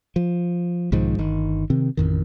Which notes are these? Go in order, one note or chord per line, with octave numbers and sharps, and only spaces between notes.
F3
B1 G#2 D#3 F3
G1 D#3
C3 D#3 C4
A1 F2 D#3